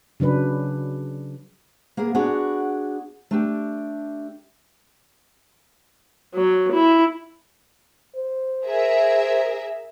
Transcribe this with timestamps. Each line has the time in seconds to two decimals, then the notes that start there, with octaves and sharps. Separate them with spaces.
0.20 C#3 F#3 D4 B4
1.97 A#3 B3 G#4
2.14 B3 D4 F#4 G#4
3.31 A3 D4 G4
6.35 F#3
6.73 E4
8.16 C5
8.66 G#4 A#4 E5